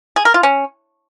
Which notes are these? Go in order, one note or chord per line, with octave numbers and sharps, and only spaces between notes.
G#4
A#4
F4
C#4